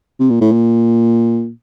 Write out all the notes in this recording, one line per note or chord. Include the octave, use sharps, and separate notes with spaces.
C3
A#2
A2
A#2